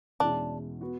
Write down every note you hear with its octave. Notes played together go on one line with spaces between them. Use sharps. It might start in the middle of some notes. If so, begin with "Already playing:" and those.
E2 B2 G#3 C#4 D4 E4
B3 F#4